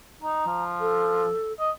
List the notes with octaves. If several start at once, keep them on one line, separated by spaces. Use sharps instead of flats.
D#4 A#5
F3
A4
D#5